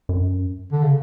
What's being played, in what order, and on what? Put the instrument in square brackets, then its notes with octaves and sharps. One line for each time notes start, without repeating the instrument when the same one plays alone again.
[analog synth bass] F#2
[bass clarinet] D3
C#3